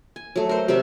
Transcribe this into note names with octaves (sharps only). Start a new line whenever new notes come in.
G#5
F#3 A3
A#4 C5
C3 G3 F#4 E5